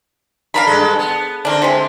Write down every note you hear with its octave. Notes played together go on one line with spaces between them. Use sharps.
D4 A#4 F5 A#5 B5
G2 G#3 A4
B3
D3 C4 D4 A#4
C3 G#3